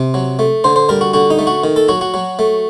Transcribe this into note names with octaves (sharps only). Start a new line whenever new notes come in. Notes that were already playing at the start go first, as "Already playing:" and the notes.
Already playing: C3
F#3
A3
D3 C5
C5
G3 A#4
F#4
D3 F#4
D#4
A3
F#4
D#3
A4
F#3 F#4
F#4
F#3
A3